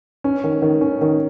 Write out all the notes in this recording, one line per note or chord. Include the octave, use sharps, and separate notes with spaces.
C#4
D#3
D#3
C#4
D#3